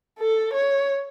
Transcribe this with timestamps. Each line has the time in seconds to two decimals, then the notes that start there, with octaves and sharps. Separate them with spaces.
0.19 A4
0.53 C#5